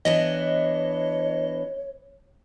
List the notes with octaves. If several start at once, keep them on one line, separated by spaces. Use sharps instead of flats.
E3 B3 D4 C#5 D#5